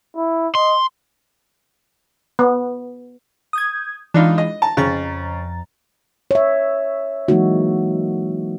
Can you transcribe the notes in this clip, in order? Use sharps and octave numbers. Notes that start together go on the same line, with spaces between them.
E4
D#5 C6
B3
D#6 G6 G#6
E3 G#3 D4 D#4 F4
D#5
A5 A#5
F2 C#3 A#5 A6
C#5 E5
E3 F#3 G#3 A#3 D#4 F#4